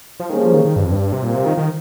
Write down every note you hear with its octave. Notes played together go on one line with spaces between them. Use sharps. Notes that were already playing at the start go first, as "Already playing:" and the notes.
F3
D#3 G3 A#3 C#4 G#4 C5
F3
D#3
D#3
G2
F2
G2
C3
A#2 G3 C4 F4 A#4
C3
D#3
D#3